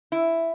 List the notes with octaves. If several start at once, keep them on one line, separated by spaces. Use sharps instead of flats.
E4